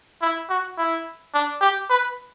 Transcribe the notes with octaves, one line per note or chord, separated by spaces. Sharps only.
E4
F#4
E4
D4
G4
B4